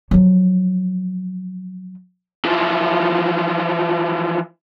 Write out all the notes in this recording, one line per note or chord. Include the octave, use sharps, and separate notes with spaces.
F3 F#3
E3 F3